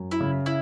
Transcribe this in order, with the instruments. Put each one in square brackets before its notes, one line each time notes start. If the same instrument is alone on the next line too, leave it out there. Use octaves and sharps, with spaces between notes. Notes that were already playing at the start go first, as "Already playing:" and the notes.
Already playing: [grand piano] F#2
[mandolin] E4
[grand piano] C#3
[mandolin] E4